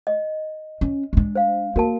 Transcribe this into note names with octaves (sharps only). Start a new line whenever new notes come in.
D#5
C#4
G#3 D4
C5 F5
A#3 F#4 A#4 A5